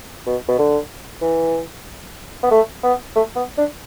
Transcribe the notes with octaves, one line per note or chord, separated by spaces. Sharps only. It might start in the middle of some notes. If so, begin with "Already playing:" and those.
B2
B2
D3
E3
B3
A3
B3
A3
B3
D4